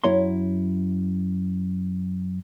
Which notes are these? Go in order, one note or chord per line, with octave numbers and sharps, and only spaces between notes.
F#2 E4 C#5 A#5 C6